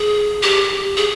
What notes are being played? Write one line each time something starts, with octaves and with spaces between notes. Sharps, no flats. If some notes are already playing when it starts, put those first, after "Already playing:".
Already playing: G#4
G4
G#4